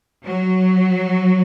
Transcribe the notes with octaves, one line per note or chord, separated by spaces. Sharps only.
F#3